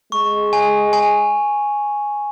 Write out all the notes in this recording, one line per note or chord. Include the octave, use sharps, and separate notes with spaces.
G#3 C#6
G#5
G#5